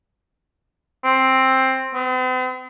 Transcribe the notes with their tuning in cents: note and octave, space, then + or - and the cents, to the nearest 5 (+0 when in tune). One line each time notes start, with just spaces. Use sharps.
C4 +10
C4 -45